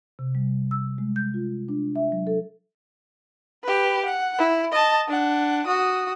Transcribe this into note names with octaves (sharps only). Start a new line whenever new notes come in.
C3
G3
E6
G#3
G6
F4
D4
E5
F#3
A4
G4 B4
F#5
E4
D#5 A5
D4 F#5
F#4 D#6